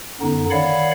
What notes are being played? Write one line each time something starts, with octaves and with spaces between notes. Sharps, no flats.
F#2 D3 B3 D#4
D#3 C#5 D5 F5 F#5 B5